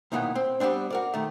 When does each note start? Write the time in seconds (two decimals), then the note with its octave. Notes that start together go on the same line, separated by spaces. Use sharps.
0.12 B1 A#2 D#3 E3 B3 F#5
0.35 C4
0.60 G3 A3 B3 C4 D4
0.90 F#4 A#4 D5
1.14 D#3 A3